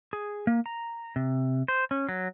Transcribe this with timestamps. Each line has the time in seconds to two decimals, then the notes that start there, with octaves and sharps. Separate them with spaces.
0.13 G#4
0.47 A#3
0.66 A#5
1.16 C3
1.68 C5
1.91 C#4
2.09 F#3